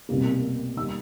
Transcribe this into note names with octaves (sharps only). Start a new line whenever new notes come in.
C2 B2 G3 A#3
D#2 D#3 G3 A#3 E6